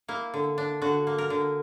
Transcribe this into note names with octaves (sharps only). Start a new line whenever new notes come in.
A#3 E4
D3
D4
D3 F#4
A#3
A#4
D3